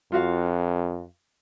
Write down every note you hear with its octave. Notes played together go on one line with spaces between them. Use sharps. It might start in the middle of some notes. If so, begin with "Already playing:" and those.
F2 F4 F#4 F5